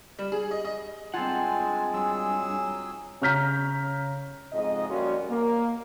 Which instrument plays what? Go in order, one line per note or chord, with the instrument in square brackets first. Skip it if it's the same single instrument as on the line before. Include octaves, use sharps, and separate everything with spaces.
[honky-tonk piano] G3
G#4
D#5
D#5
[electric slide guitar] G2 F#5 [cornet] G#3 [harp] C4 F4 [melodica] G#5 A5
[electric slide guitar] G2 [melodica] F#3 G#4 E6
[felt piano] C#3 C#5 A#5 F6 G6 B6
[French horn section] F2 G#2 G#3 D#5
F3 G3 A#3 C#4 F4 F#4
A#3